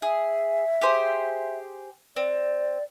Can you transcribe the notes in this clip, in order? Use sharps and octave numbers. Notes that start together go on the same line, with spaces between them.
G#4 E5
G4 G#4 C5
C4 D5